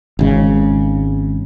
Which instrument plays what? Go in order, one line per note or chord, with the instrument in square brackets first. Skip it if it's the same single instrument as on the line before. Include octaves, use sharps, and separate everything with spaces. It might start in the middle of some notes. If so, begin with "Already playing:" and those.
[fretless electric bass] G#1 C#3 G#3